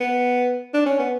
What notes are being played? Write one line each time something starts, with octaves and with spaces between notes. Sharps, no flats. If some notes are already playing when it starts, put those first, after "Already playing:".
B3
D4
C#4
B3